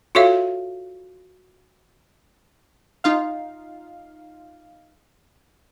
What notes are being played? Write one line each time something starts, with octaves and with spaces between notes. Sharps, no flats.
F4 F#4 A4 C#5 E5 F5
D#4 F4 F5